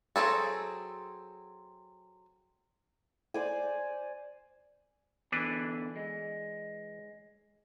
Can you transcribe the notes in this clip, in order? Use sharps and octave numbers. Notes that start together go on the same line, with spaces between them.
F#3 C4 G#4 A4
C5 D5 G#5
B2 D3 E3 D4 B4
G#3